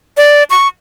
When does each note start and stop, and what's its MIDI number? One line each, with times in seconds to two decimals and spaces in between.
0.17 0.43 74
0.50 0.68 85